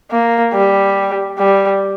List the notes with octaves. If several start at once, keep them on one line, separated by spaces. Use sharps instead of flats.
A#3
G3
G3